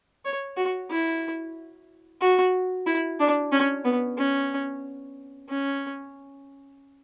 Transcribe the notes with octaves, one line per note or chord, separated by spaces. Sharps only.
C#5
F#4
E4
F#4
E4
D4
C#4
B3
C#4
C#4